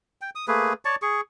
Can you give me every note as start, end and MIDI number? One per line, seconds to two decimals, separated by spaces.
0.21 0.30 79
0.35 0.46 87
0.48 0.73 57
0.48 0.73 58
0.48 0.73 68
0.48 0.73 71
0.85 0.96 73
0.85 0.96 74
0.85 0.96 81
0.85 0.96 85
1.02 1.21 68
1.02 1.21 85